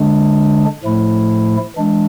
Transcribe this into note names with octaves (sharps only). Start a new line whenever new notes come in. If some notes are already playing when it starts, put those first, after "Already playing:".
Already playing: D3 G#3 D4
A2 F3 A3 E4
E3 G#3 D4